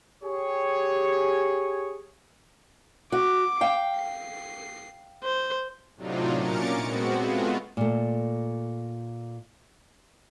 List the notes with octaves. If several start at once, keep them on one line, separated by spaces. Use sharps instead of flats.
G4 G#4 C#5
F#4 D6
F5 G5
C7
C5
A2 C3 F#3 D4 D#4 F4
A#2 C#4 A#4 D6 A6 C#7
G#3 B3 C4 F#4
G#3 A3 B3 F4 F#4
A#2 A3